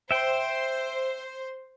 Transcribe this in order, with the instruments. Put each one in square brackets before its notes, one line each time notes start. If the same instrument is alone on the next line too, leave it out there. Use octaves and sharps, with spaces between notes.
[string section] C5 [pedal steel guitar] E5 G5